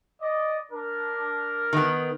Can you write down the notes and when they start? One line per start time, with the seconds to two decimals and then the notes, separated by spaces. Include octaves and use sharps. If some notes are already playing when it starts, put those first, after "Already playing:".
0.21 D5 D#5
0.72 D4 A#4
1.73 D#3 B3